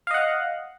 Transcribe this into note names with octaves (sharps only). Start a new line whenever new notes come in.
D#5 F5 F#5